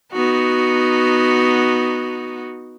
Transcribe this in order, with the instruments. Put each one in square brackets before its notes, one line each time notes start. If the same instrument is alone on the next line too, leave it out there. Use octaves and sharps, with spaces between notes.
[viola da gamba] B3 D#4 F#4